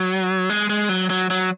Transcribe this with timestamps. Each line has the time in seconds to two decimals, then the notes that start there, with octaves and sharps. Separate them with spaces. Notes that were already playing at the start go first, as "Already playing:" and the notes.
Already playing: F#3
0.50 G#3
0.70 G#3
0.89 F#3
1.10 F#3
1.30 F#3